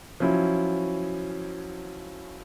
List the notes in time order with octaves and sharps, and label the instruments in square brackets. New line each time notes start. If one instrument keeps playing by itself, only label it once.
[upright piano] F3 F#3 C#4 E4